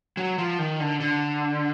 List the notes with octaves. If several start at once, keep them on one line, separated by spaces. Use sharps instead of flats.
F#3
F3
D#3
D3
D3